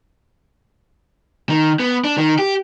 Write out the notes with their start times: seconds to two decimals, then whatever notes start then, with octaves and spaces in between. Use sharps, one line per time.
1.49 D#3
1.80 B3
2.04 D4
2.18 D#3
2.39 G4